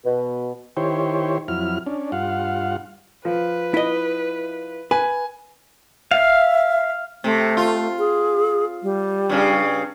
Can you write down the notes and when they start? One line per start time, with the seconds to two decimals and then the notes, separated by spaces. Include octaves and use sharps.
0.05 B2
0.77 D#3 E4 G4 C5 C#5
1.48 F2 F#3 E4 F6
1.87 C#4 D4
2.12 G2 F4 F5 F#5
3.25 F3 B4
3.74 E4 D#5
4.91 B4 G#5
6.11 E5 F5
7.24 C3 A3
7.57 F4
7.99 G#4
8.83 G3
9.29 G2 C#3